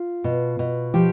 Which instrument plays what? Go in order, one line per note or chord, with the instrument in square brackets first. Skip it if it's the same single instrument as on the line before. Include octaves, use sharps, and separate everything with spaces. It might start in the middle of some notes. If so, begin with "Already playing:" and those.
Already playing: [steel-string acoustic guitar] F4
B2
B2
F3 G4